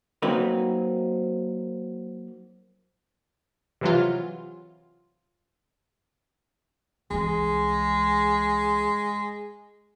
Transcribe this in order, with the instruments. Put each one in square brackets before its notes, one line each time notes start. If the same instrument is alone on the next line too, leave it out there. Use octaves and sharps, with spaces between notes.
[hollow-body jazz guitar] F#3 A#3 C4 D#4 B4
[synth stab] C3 E3 F#3 F4
[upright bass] C2 E3 [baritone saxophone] G#3